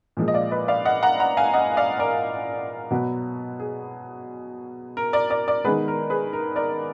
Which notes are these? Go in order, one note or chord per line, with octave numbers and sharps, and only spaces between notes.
A#2 F3 G#3
D#5
D5 F5
B4 D#5
D5 F5
D#5 F#5
F#5 A#5
F#5 A#5
F5 G#5
D#5 F#5
D5 F5
A#4 D5
B2 F#3 B3
G#4
A#4
A#4 D5
A#4 D5
A#4 D5
D#3 G#3 B3 G#4 B4
A#4
G#4 B4
A#4
A#4 D5